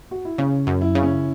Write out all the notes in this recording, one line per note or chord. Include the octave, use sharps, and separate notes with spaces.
F#4
E4
C#3 C#4
F#2
E4
C#3
C#4